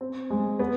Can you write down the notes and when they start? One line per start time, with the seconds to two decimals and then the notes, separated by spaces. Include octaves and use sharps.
0.01 C4
0.30 G#3
0.59 B3